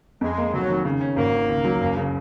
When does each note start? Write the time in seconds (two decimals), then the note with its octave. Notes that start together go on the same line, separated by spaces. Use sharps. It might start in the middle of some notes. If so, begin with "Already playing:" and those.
0.21 F2 G#3
0.38 A#3
0.53 F1 F#3
0.70 D#3
0.85 C#3
1.01 C#4
1.16 G#1 A#3
1.33 D#3
1.49 C#2
1.65 F#3
1.81 F#1
1.97 C#3